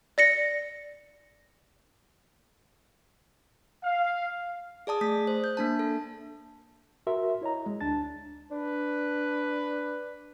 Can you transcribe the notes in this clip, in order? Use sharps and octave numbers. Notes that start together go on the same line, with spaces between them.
D5 A#6 C#7
F5
G#4 D5 A5 D#6
A3 D#6 B6
C5
G6
A#3 D4 A5
A4
F#4 A#4 E5 C6
E4 C#5 D#5 A#5
G#3
D2 D4 A5 A6
D4 B4